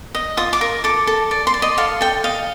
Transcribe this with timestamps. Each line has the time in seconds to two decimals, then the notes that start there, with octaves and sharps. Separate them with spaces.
0.15 D#5
0.37 F4 D#6
0.53 D6
0.61 A#4
0.84 A4 D6
1.07 A4
1.31 D5
1.47 C6
1.54 D5
1.62 D#5
1.78 A4 F5
2.01 A4 G5
2.24 D#5 F5